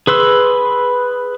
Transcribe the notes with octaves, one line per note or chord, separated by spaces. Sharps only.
G#4 B4 C6 E6